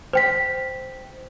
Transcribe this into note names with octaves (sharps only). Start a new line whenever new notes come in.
C5 G5 B6